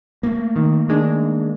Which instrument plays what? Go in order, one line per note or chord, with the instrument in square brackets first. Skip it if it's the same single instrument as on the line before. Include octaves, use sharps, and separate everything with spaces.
[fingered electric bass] A3 A#3
[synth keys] D#3
D#3 G#3 D4